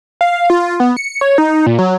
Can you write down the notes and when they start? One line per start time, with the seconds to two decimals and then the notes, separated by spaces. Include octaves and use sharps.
0.21 F5
0.50 F4
0.80 B3
0.97 C#7
1.21 C#5
1.38 D#4
1.66 A#2
1.79 F#3